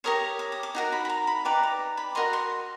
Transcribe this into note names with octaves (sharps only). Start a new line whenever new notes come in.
G4 A#4 C#5 D#6
D6
D#6
D6
D#4 F#4 A#4
B5
B5
A#5
B5
D#4 G4 B4 D5 A#5
A#5
B5
F#4 A#4 D#5 C6
C6